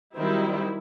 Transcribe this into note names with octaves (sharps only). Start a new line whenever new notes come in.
D#3 F#3 G3 C4 D#4 E4